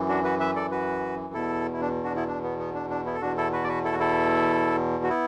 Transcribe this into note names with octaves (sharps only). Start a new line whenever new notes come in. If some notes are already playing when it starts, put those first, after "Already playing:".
Already playing: F#2 E3
D4 F#4
F#4 B4
B4 E5
A4 D5
F#4 B4
E2 B2 E4 A4
E4
D4
D4 F#4
B3 E4
D4
B3
B3
D4
D4
B3 E4
A4
E2 B2 D4 F#4
E4 A4
F#4 B4
D5
F#4 B4
E4 A4
F#4
E4 A4
F#4
B3 E4